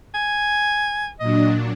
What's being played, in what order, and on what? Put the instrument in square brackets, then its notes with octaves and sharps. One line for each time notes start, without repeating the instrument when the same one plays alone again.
[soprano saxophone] G#5
[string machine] A#2 F#3 D4 [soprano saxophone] D#5